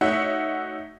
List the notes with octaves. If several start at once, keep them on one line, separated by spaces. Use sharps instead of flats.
A3 D#4 F#4 C#5 E5 F#5